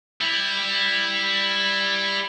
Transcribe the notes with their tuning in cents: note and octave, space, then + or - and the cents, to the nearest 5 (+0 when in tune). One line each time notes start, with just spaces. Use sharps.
G3 +5 E4 +0